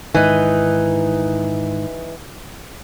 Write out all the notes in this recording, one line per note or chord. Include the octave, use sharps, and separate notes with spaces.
G#2 D#3 E3 D#4